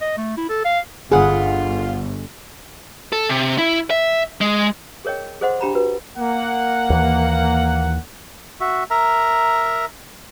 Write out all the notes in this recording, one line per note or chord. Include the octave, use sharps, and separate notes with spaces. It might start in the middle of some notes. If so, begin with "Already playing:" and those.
D#5
A3
E4
A4
F5
G1 F4 G#4 B4 F#5
A4
C3
E4
E5
G#3
G#4 A#4 C#5 D#5 G5
G#4 A4 C5 D#5 F#5 C6
D4 G4 A#5 B5
F#4 B4
A#3 F#5
D#2 E3
F#4 E5
A#4 E5 A#5